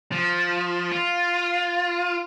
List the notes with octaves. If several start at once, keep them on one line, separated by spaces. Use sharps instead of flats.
F3
F4